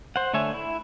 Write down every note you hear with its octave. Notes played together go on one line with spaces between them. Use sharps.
C5 F#5
D3 A3 C#5 E5 G#5
E4